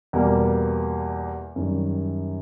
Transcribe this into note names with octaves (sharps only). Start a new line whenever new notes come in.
E2 B2 G3 A#3
F#2 D#3 G3